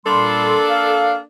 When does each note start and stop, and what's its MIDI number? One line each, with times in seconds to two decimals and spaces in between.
0.06 0.57 46
0.06 0.57 55
0.06 1.20 58
0.06 1.20 62
0.06 1.20 69
0.06 0.57 84
0.69 1.14 77